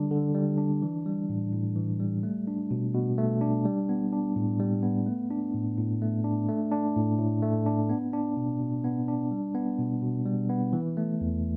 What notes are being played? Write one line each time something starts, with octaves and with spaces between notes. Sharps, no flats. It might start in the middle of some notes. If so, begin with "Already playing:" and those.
Already playing: D3 G3 D4
D3
G3
D4
E3
G3
A2
A2
E3
G3
A3
D4
B2
B2
A3
D4
G3
B3
D4
A2
G3
B3
A3
D4
A2
A2
A3
D4
A3
D4
A2
A2
A3
D4
B3
D4
B2
B2
B3
D4
G3
B3
B2
B2
G3
B3
E3
A3
E2